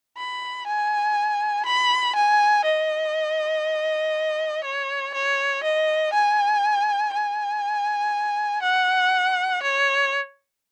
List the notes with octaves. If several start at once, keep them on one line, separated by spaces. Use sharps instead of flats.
B5
G#5
B5
G#5
D#5
C#5
C#5
D#5
G#5
G#5
F#5
C#5